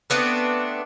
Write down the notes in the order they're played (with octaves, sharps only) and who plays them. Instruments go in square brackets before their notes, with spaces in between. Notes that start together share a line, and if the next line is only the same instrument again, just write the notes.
[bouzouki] A3 B3 C4 D4